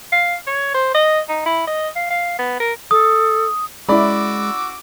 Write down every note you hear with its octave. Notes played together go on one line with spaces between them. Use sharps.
F5
C#5
C5
D#5
D#4
E4
D#5
F5
F5
B3
A#4
A4 D#6
G#3 C#4 E4 F#4 D5 B5 D6 E6